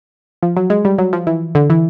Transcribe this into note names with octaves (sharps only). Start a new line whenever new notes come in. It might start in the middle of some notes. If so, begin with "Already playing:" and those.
F3
F#3
G#3
G3
F#3
F3
E3
D3
E3